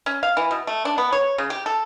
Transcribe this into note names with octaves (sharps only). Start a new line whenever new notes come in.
C#4
F5
E3
B2
A3
D4
B3
C#5
C#3
G4
A4